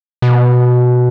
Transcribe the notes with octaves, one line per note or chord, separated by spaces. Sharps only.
B2